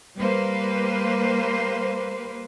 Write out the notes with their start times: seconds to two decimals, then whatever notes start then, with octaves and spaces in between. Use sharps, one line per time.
0.18 G3 A#3 B4 C5